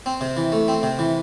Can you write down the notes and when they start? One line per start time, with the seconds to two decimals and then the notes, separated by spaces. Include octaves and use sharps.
0.06 C4
0.21 C3
0.37 E3
0.52 A3
0.68 C4
0.83 C3
0.99 E3